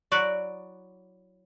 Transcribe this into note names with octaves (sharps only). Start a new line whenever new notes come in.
F#3 E4 F#4 D5